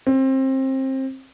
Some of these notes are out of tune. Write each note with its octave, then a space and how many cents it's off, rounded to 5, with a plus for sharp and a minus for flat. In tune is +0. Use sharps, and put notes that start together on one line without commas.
C4 +25